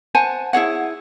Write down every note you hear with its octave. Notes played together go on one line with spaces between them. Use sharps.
C5 F#5 G#5 A5
E4 G#4 C#5 F#5